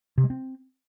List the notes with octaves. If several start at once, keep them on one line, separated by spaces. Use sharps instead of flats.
C3
G#3
C4